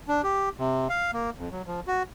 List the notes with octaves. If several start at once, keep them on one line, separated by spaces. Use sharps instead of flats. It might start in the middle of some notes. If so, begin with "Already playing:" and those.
D4
G4
C3
F5
A#3
F2
F#3
F3
F#4